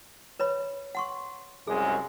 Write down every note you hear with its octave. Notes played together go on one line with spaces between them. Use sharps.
B4 C#5 B5
F#5 C6 C#6
C2 F#2 G#3 G#4